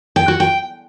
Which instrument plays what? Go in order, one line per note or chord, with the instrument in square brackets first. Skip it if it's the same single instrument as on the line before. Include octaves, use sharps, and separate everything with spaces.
[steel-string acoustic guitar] G5
F#4
G5